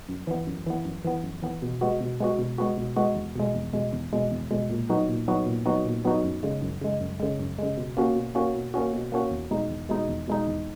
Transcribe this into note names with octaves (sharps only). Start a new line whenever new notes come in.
F#2
E3 B3
F#2
E3 B3
F#2
E3 B3
F#2
E3 B3
B2
G#3 B3 F#4
B2
G#3 B3 F#4
B2
G#3 B3 F#4
B2
G#3 B3 F#4
E2
B2 G#3
E2
B2 G#3
E2
B2 G#3
E2
B2 G#3
A#2
F#3 B3 D#4 F#4
A#2
F#3 B3 D#4 F#4
A#2
F#3 B3 D#4 F#4
A#2
F#3 B3 D#4 F#4
F#2
C#3 G#3
F#2
C#3 G#3
F#2
C#3 G#3
F#2
C#3 G#3
B2
A#3 C#4 F#4
B2
A#3 C#4 F#4
B2
A#3 C#4 F#4
B2
A#3 C#4 F#4
E2
B2 G#3 D#4
E2
B2 G#3 D#4
E2
B2 G#3 D#4
E2